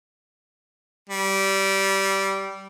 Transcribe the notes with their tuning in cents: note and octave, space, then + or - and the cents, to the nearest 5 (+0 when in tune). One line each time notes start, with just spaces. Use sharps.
G3 -15